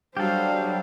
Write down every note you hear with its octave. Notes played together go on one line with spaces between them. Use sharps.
F#3 G3 D4 G4 A4 C5 F5